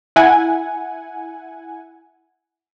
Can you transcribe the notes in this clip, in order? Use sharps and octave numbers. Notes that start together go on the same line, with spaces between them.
E4 F#5 G#5